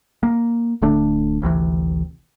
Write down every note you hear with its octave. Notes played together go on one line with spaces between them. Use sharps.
A#3
D1 D3 A3 D4
G#1 D2 C3 E3